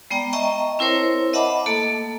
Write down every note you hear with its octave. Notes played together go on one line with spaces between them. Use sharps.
G#3 B3 D5 G5 A#5
D#5 E5 G5 A5 A#5 C#6
C4 E4 A#4 C5 C#5
D#5 E5 F#5 A5 B5 D6
A3 A#3 A4 A5